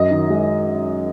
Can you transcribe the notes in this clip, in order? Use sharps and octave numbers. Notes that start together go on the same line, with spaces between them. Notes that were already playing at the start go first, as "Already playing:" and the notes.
Already playing: F#2 D#5
D#3
G#3